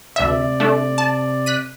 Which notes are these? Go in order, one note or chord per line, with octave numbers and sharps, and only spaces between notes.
D2 C3 D5 E5
A3 D4
A5
F#6 B6 D#7